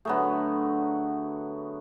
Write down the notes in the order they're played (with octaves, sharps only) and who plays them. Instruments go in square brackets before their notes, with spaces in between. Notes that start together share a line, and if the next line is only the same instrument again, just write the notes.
[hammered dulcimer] D3 F#3 A3 [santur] B3 G#4